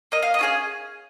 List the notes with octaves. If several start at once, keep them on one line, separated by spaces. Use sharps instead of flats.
A#3 D#5
F5
D#5
C#4 F4 G#4 F5